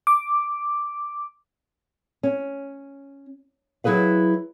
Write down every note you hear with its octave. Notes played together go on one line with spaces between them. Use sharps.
D6
C#4
F#3 E4 G#4 B4 F5